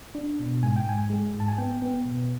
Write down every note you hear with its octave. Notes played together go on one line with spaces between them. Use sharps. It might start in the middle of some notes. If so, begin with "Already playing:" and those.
D4
B2
G#2 G#5
G5
G#2 G#5
G#3
G#2
A5
G#5
B3 G5
B3
B2